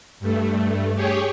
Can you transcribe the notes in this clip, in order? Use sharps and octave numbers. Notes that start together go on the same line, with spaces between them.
G2 A3
G4 G#4 C#5